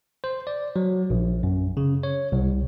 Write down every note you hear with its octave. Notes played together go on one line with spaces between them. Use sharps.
C5
D5
F#3
A#1
F#2
C#3
C#5
C2